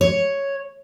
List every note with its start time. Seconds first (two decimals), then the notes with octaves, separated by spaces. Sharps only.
0.01 C#5